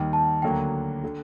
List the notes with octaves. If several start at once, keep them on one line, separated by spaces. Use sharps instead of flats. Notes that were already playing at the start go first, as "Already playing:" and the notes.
Already playing: D#2 D#3 G3 G5
A5
D2 D3 F#3 A#3 G5
D3